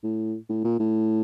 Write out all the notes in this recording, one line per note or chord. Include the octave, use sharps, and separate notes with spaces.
A2
A2
A#2
A2